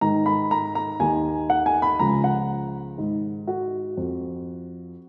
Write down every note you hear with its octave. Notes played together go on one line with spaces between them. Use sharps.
G#2 D#3 A#5
B5
A#5
A#5
D#2 D#3 G#5
F#5
G#5
B5
C#2 C#3 F3 A#5
F#5
G#2 D#3
F#4
F2 F3